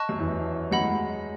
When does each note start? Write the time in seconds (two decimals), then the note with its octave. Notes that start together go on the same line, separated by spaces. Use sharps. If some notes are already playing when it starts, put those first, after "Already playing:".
Already playing: D#5 A5 C#6 F#6
0.09 F#2 F#3
0.19 E2 E3
0.71 F#2 F#3 D#5 F#5 B5
0.82 G#3